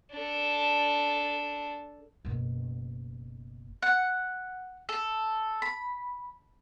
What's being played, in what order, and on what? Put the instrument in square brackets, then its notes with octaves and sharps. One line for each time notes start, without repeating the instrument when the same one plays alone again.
[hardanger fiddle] D4 A4
[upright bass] F#1 B2
[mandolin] F#5
A4
B5